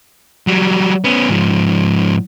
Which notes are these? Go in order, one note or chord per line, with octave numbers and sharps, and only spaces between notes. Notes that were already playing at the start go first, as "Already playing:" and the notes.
F#3 G3
B3 C#4
G#2 F3